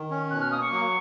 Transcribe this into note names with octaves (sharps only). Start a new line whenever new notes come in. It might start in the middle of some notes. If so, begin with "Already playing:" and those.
Already playing: D#3
C#4
B2 F#6
F6
A#3 D#6
C#6
F#3